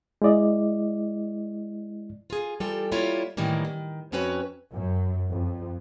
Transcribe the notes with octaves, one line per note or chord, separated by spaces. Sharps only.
G#3 E4 D5 D#5
F4 G#4
E3 G3 F4 G4 A4
G3 A#3 E4 F4 C#5
A2 D#3 E3 G3 A#3
D#3
F2 C4 C#4 F#4 B4 C#5
F#2
F2